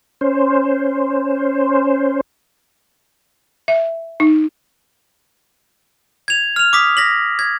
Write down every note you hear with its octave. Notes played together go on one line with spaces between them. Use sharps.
C#4 C5
E5
D#4
G#6 F7
F6 F7
D6 D#6 B6
A#6 B6 F#7
G#6